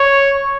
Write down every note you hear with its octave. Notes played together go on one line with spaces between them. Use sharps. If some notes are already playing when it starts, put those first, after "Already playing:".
Already playing: C#5